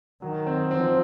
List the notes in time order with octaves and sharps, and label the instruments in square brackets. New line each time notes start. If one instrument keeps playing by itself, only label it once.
[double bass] D#3 [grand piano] F#3
[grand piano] C4
[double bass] F3 [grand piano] C4